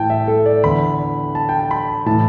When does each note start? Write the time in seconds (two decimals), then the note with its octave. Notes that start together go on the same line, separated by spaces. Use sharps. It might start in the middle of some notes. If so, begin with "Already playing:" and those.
Already playing: A2 E3 G5 A5
0.10 E5
0.28 A4
0.46 D5
0.64 E2 D3 B5
1.35 A5
1.49 G5
1.59 A5
1.71 B5
2.06 A2 E3 A5